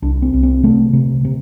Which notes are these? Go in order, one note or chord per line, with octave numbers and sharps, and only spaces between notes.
C2 D4
C4
C2
C4
C3 A3
C3
C3